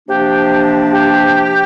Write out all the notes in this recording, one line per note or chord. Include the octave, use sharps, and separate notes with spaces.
C3 F3 A#3 D4 G4
G4